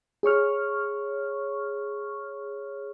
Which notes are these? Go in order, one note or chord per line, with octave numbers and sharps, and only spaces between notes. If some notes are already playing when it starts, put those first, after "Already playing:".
G#4 C#5 C#6 F6